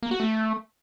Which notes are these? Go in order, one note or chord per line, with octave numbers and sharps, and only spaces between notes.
A#3
F#4
A3